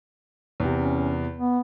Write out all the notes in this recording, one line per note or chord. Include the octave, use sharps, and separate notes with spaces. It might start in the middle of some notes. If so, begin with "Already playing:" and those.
E2 C3
C#4
B3